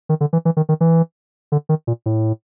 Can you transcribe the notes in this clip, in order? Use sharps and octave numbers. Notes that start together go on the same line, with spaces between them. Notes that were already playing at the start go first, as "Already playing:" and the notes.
D#3
D3
E3
E3
D#3
D#3
E3
D3
D#3
A#2
A2